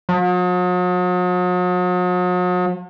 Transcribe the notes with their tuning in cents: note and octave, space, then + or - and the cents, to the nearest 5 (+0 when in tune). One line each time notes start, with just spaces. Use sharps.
F#3 -45